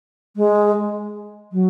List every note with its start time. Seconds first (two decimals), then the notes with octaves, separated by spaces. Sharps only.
0.36 G#3
1.52 F#3